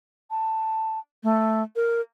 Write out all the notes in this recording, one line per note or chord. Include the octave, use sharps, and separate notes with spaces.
A5
A3
A#4